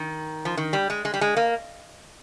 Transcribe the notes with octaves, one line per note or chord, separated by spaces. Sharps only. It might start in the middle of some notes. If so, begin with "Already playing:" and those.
Already playing: D#3
F3
D#3
G3
G#3
G#3
G3
G#3
A#3